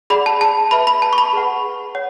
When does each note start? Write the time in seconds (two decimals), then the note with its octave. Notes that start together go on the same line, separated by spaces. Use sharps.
0.10 G#4 D5 F#5 B5
0.26 A5
0.41 A5
0.71 B4 E5 B5
0.87 B5
1.02 A5
1.13 C#6
1.18 B5
1.33 G#4 B4 F#5
1.95 C#5 F#5